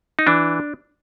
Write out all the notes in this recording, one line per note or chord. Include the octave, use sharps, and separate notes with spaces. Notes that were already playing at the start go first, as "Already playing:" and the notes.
D#4
E3 D4